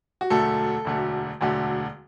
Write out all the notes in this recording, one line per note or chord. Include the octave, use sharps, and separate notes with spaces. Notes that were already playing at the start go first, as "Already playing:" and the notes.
F#4
E1 D2 D3 F#3 A3 A4
E1 D2 D3 F#3 A3
E1 D2 D3 F#3 A3